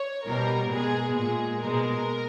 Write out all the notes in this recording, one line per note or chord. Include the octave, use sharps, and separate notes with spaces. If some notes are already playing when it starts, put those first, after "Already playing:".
Already playing: C#5
B2 G3 A#4
B2 G#3 G#4
A#2 G#3 G#4
B2 G#3 A#4